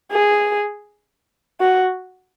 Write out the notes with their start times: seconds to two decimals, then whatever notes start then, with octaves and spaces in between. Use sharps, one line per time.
0.12 G#4
1.60 F#4